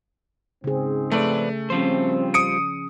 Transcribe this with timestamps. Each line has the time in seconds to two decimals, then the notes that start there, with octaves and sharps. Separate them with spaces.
0.64 G#2 C#3 C4 G#4
1.11 F2 A3 B4 D5
1.70 F3 G3 C4 C#4 F4 C5
2.34 D#6 C#7 D7